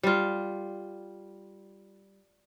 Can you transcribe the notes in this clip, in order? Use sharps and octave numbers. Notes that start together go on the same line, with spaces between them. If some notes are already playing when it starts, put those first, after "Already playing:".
G3 F4